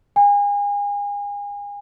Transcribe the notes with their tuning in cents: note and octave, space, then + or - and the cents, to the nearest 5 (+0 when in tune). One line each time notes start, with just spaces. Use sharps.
G#5 -35